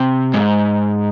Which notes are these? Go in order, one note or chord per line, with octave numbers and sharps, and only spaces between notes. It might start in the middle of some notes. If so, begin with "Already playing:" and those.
Already playing: C3
G#2